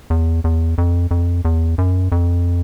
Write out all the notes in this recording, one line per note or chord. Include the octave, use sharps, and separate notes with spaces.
E2
E2
F2
F2
E2
F#2
F2